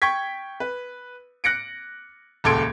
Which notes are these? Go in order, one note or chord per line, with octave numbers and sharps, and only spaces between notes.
G5 C#6 G#6 B6
B4
F#6 A#6 C#7 D7
D#1 C#2 A4 C6 G#6 D7